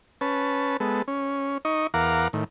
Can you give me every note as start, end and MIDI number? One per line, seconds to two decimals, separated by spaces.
0.21 0.77 61
0.21 0.77 71
0.21 0.77 81
0.80 1.02 56
0.80 1.02 59
0.80 1.02 69
1.08 1.58 61
1.65 1.87 63
1.65 1.87 75
1.65 1.87 85
1.94 2.28 40
1.94 2.28 70
1.94 2.28 77
1.94 2.28 78
1.94 2.28 82
1.94 2.28 86
2.33 2.44 45
2.33 2.44 51